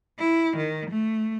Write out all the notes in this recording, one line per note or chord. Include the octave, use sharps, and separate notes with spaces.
E4
D#3
A3